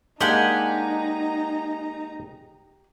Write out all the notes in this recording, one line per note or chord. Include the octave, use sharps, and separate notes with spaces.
G#3 A#3 D4 D#4 G4 F#5 G#5 A#5